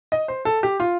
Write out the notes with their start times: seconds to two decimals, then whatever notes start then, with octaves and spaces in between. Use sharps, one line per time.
0.12 D#5
0.28 C5
0.45 A4
0.63 G4
0.80 F4